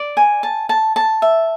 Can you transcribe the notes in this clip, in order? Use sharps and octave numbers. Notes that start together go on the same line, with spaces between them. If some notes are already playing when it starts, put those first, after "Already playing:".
Already playing: D5
G#5
A5
A5
A5
E5